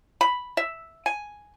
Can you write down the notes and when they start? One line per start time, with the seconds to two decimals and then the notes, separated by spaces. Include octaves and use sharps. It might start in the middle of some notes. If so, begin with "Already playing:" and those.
0.21 B5
0.57 E5
1.06 G#5